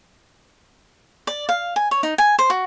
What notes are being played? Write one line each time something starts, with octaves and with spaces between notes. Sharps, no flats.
D5
F5
G#5
C#5
D#4
G#5
C5
F#4